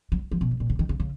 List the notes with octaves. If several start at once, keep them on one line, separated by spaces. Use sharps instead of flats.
F#3
F3
B2
F#2
A#2
C#3
D#3
C#3
C#3